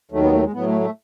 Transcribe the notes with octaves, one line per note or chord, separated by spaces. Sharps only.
D#2 D#3 F#3 A3
B3
A3
G#3
A2 F#3 B3
A3
A3